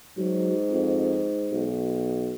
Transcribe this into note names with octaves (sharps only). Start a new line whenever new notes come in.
G#2 F#3
F2
B1